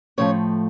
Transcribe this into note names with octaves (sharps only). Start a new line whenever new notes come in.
A2 F3 A3 C#4 C#5